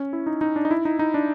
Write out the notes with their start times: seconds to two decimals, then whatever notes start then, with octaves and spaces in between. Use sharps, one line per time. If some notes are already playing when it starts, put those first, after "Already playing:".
Already playing: C#4
0.13 E4
0.27 D#4
0.41 D#4
0.56 D4
0.65 D#4
0.71 E4
0.85 D#4
0.99 D#4
1.14 D4